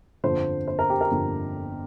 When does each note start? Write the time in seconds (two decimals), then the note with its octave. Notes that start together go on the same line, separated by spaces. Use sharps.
0.24 G1 F2 D3 F3 C5
0.68 C5
0.79 A#4
0.90 G4
1.01 A#4
1.11 G1 F2 D3 F3